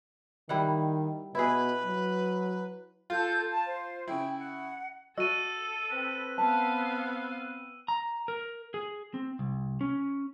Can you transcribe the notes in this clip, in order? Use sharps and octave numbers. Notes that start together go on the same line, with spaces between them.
D#3 G3 E4 F#5
B2 E4 G#4 B4
F#3
F4 A4 G6
A5
C5
C#3 E4 G5
F#5
F#4 A4 D#5 E6 D#7
C4 B4
B3 F5 A5
A#5
A#4
G#4
C4
C2
C#4